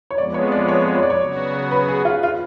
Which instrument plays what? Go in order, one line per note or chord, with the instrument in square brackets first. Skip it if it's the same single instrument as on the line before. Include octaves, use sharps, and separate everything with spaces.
[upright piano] C#5
[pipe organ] F2 F3 G#3 B3 [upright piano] D5
[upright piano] C#5
D5
C#5
C#5
D5
C#5
[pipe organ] C#3 F#3 B3 F#4
[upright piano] B4
G#4
F4
F4